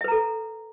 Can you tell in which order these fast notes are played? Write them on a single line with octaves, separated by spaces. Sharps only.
E5 B4 A#5 A4